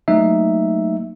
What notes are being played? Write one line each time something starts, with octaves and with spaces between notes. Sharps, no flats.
F#3 A3 A#3 D#4 E5